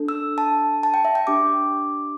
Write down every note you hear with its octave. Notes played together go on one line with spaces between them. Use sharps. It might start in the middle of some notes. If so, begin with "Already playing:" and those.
Already playing: D4 A4
E6
A5
A5
G5
E5
G5
D4 G4 D6